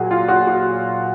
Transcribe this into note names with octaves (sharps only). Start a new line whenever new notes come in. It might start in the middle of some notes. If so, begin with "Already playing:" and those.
Already playing: A#2 F#3 F#4 G#4
F4
F#4
F#4